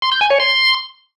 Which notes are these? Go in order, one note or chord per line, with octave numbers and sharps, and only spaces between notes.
C6
G6
G#5
C#5
C6